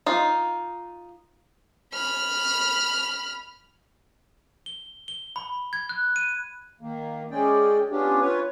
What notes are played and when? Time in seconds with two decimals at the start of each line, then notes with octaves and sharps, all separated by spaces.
0.06 D#4 F4
1.94 B5 F6
4.66 G7
5.08 G7
5.36 B5
5.73 G#6
5.89 F#6
6.16 D#7
6.81 D#3 A#3
7.31 G#3 C#4 G#4 D5 G5
7.90 B3 C#4 D4 F4 G4
8.21 F4 B4 C#5